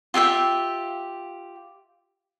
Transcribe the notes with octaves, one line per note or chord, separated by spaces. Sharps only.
F4 G4 E5 G5